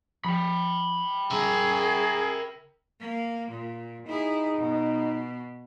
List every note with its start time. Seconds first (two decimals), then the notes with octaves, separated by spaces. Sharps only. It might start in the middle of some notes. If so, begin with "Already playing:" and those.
0.24 F3 G5 B5
1.31 C#3 G#4 A#4 E5
3.01 A#3
3.50 A#2
4.07 D#4 E4 G#4
4.57 B2